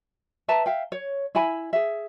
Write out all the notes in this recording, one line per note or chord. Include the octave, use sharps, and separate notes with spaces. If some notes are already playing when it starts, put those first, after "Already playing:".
B4 E5 A5 A#5
E5 F5 G5
C#5
E4 E5 G#5 B5
G#4 E5